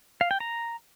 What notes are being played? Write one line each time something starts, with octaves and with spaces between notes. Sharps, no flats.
F5
G5
A#5